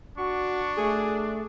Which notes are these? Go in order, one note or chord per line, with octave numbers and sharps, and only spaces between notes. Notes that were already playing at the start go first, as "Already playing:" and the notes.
D4 F#4 C#6
A3 G#4